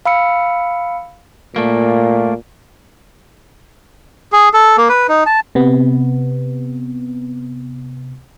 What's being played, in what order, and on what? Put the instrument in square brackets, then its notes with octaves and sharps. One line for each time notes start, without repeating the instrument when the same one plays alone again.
[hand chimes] F5 B5 E6 C#7
[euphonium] A#2 [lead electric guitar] A3 A#3
[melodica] G#4
A4
A#3
B4
D#4
A5
[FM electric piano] C3 B3